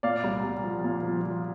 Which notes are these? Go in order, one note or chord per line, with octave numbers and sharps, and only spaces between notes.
A#2 D5 F5
C2
C2
F3
A#2
F3
F3